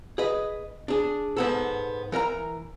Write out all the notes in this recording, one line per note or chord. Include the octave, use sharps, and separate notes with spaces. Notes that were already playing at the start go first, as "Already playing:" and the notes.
G#4 B4 D#5
D4 G#4
G#2 B3 A4
E3 A#4 E5 A#5